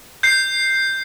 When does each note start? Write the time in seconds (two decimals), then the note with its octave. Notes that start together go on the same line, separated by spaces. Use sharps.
0.23 G6 C7